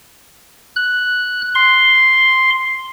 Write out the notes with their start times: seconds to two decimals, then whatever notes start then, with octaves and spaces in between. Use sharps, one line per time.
0.76 F#6
1.55 C6